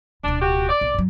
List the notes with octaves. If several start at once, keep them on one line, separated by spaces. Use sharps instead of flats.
D1 B2 D4
F#4 G4
D5
B1
G2 F#3